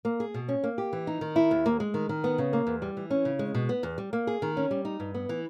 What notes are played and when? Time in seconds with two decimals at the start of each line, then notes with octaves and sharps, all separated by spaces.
0.05 A#3
0.20 G#4
0.34 B2
0.48 C#4
0.64 A#3
0.78 G4
0.93 E3
1.07 D#4
1.21 D#3
1.36 E4
1.51 D#2
1.66 A#3
1.80 G#3
1.94 D#3
2.09 D#3
2.24 B3
2.38 C#3
2.53 A#3
2.67 E2
2.82 G3
2.97 E3
3.10 C#4
3.25 C#3
3.39 G#3
3.54 B2
3.69 B3
3.83 E2
3.98 G3
4.13 A#3
4.27 G#4
4.42 D#3
4.57 C#4
4.71 G3
4.85 D#4
5.00 G2
5.14 B3
5.29 E3